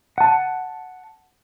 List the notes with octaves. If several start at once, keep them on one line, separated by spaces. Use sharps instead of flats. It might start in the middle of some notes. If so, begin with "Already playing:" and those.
F#5 A5